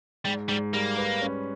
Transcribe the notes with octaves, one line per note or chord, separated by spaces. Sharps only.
G#2 G3
G#2 G3
G3 A#3
B4
C#4